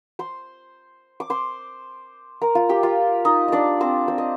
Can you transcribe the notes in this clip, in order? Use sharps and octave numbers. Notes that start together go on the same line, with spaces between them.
C5 C6
D6
C5 C6
A#4 A#5
F4 F5
G4 G5
F4 F5
D#4 D#5
D4 D5 D#5
C4 C5
C4 C5
D#5